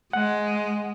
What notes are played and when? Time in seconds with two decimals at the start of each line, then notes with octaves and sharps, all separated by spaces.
0.13 G#3 F#5